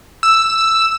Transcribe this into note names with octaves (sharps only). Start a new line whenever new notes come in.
E6